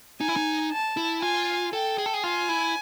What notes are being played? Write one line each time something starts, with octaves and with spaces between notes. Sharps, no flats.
D#4 G#5
E4
D#4
A5
E4
F4 G#5
A4 G5
G#4
A4
G#4
F4 G#5
E4